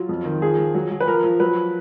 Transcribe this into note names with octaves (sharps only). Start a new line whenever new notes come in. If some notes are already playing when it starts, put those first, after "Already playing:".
Already playing: F#3 F4
F2
D#3
F3 G#4
F3
F#3
F#3
B4
F3 A#4
F3
F#3 B4